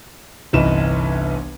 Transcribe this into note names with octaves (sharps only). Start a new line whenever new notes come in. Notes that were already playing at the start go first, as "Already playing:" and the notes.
G1 C2 E3 D#4 B4 E7